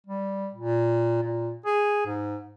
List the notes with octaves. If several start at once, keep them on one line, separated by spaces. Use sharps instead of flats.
G3
A#2
A#2
G#4
G#2